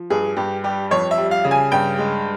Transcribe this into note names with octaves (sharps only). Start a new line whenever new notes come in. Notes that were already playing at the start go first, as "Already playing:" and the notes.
Already playing: F3
G2 G#4
G2 G4
G3 G4
F2 C#5
E5
G3
F5
C#3
G#5
G2 G5
G#3